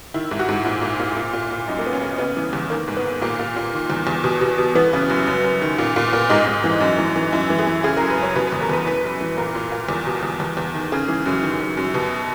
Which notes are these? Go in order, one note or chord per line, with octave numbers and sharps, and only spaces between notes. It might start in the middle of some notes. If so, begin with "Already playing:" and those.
D#3 E4
G#2
F#4
G#2
A#2 E4
A#2
A#2
A#2
A#2
A#2
F#2 D#4
A#3
F#2 B3
C#4
C#3
C#3 B3
E3
E2
D#3 A#3
G#2
B3
D#3
A#2 A#3
A#2
A#2
D#3
E2
E2
B2
B2
B2
E3 B3
C#3
F#2
F#2
F#2
D#3
A#2
A#2
A#2
G#2 D#4
G#2
E3
F#2
E3
E3
F#2 E4
E3
G#4
E3
C#3 G#4
F#2 A#4
B4
F#2 C#5
B2 B4
E2 B4
A#4
E2 B4
E3 B4
F#2
E3
A#2 A#4
A#2
A#2
E2
B2
E2
E2
E2
D#3
C#3 G#4
E3
F#2
D#3
F#2
F#2
B2